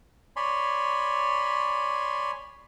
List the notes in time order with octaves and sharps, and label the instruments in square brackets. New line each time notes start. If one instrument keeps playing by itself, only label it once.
[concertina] C#5 D5 G#5 B5 C6